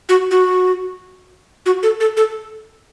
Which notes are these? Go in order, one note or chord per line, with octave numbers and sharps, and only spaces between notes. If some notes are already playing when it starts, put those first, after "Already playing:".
F#4
F#4
F#4
A4
A4
A4